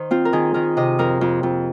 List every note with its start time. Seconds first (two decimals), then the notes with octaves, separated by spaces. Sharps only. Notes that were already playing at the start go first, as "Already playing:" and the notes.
Already playing: D#3 C5
0.11 C4 F4
0.25 A#4
0.33 D#3 G#4
0.54 D#3 A#4
0.77 C3 D#5
0.99 F2 A#4
1.21 F2
1.43 F2